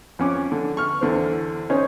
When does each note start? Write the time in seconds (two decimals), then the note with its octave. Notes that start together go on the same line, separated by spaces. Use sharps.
0.19 F2 C#4 D6
0.52 D3
0.77 C#6 F6
1.01 E2 D3 C4
1.70 C#4 D#4 C5 C#5